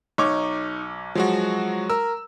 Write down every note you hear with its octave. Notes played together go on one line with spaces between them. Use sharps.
B1 D#4 C#5 D6
F3 F#3 G#3 F#4
A#4 E6